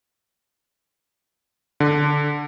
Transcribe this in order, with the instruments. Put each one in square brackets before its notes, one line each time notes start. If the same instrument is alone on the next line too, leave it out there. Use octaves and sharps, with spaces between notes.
[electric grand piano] D3